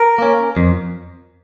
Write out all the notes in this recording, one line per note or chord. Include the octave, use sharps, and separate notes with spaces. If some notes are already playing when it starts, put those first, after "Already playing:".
Already playing: A#4
A#3 C#4
F2